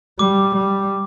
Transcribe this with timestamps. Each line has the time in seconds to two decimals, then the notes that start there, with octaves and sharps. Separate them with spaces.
0.19 G3 D6
0.55 G3